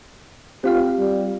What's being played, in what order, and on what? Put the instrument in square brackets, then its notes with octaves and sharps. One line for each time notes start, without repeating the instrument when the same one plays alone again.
[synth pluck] C4 F4 F5 [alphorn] G4
[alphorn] G3